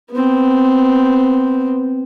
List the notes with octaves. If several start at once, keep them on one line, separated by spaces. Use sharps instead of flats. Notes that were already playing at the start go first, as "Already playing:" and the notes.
B3 C4